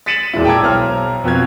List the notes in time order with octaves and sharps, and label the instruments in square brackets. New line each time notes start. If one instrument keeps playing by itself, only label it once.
[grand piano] A6 B6 C#7 D#7 E7 F#7
E1 A#2 E3 G#3 E4
G5 A5 A#5 D6 E6 G#6
B1 C5 A#5 F6
F2 B2 F4 B4 G#6